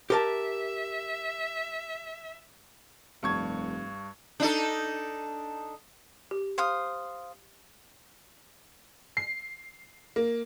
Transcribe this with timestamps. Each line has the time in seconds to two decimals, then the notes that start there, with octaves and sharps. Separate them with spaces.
0.10 G4 A#4 E5 A5
3.23 F1 G2 C#6 G#6
4.40 D4 D#4 A4
6.31 G4
6.58 C5 F5 D#6
9.17 C7
10.16 A#3